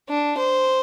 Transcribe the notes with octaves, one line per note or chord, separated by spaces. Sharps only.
D4
C5